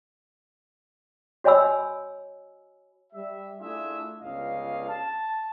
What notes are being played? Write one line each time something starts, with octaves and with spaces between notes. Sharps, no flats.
F#4 C#5 D#5 G#5 B5 E6
G3 E5
A3 D4 E4 F4 G#4 E5
G1 C#2 G2 D#5 F5
A5